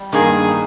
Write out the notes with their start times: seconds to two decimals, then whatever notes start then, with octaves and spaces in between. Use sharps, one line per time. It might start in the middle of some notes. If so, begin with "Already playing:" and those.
Already playing: G3
0.12 G2 D#3 A#3 G#4
0.51 G3